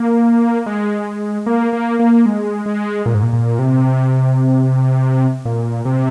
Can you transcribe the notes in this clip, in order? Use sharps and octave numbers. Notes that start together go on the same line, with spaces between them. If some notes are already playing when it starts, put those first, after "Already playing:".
Already playing: A#3
G#3
A#3
A#3
A#3
G#3
G#3
A#2
G#2
A#2
A#2
C3
A#2
C3